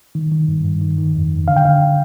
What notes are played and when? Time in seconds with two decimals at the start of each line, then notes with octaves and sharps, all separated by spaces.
0.15 D#3
0.32 D#3
0.48 G2
0.65 G2
0.81 D#3
0.98 D#3
1.15 F2
1.31 F2
1.48 D3 F5
1.57 G5
1.65 D3 F5